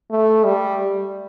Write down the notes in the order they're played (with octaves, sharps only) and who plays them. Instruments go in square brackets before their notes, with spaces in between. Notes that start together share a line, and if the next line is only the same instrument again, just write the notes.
[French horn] A3
G3